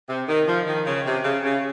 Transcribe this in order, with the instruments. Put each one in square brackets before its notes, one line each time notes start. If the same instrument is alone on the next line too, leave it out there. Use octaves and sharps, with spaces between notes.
[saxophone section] C3
D#3
F3
D#3
C#3
C3
C#3
C#3